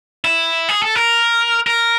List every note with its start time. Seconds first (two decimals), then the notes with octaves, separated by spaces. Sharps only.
0.24 E4
0.69 G#4
0.82 A4
0.96 A#4
1.67 A#4